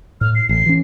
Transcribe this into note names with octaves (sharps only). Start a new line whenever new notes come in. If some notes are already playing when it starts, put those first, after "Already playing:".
A2 F6
C7
A1 C7
E3 C#4